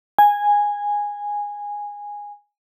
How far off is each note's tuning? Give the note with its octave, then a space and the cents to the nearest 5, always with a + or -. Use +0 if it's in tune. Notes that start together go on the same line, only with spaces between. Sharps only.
G#5 -10